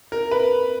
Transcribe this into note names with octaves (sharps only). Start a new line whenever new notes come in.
A#4
B4